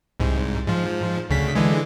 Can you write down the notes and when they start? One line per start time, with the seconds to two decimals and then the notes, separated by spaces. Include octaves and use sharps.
0.20 C2 G#2
0.67 G#2 F3
1.30 D2 C#3 B6
1.55 D3 E3 G#3